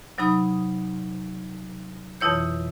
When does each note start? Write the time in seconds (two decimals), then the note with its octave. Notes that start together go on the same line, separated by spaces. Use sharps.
0.18 C3 F#3 D#4 B5 D#6
2.21 F2 B2 E3 E4 C#5 G6